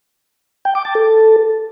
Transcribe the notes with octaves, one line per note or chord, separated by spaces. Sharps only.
G5
D6
A5
A4